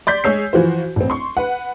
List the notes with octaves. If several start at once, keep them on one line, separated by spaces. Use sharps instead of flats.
D5 C6 G6 B6
G#3 G#4 C#5 E6 C7
E3 F3 F#4 C5
A1 C4
C6 C#6
B4 F#5